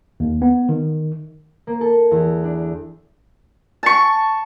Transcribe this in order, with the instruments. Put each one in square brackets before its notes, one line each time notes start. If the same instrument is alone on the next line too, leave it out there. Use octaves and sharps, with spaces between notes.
[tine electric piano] D#2
B3
D#3
[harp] A#3
A4
E2
D4
[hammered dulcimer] A5 C#6